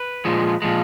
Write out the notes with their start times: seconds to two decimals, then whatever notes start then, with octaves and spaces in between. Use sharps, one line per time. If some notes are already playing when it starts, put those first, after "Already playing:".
Already playing: B4
0.25 A#2 F3 G#3
0.62 A#2 F3 G#3